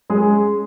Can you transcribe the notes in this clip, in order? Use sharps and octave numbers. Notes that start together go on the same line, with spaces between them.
G#3 C#4 G#4